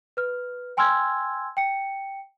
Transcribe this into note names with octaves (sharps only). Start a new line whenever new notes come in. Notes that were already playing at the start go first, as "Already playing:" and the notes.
B4 F6
G5 G#5 C6 E6 F6 G#6
G5 C#7